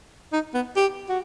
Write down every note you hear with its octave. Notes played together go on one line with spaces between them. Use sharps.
D#4
B3
G4
F#4